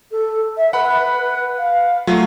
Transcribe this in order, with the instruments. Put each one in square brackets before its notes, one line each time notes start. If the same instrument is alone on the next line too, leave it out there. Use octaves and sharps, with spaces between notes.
[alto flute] A4
E5
[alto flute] B4 [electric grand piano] F#5 B5
[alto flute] F5
[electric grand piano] F#3 A3 F4